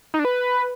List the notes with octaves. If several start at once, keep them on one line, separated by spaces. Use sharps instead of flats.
D#4
D4
B4